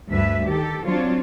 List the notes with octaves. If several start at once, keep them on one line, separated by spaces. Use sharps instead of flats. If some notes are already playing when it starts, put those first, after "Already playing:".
D2 G2 B4 E5
D#3 G4 A4
F#3 C4 D4 F4 C#5